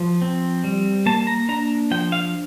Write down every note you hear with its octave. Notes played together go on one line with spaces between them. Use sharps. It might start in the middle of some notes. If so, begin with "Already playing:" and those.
Already playing: F3
C4
G3
A#3 A5
A#5
D4 A#5
F3 G5
F5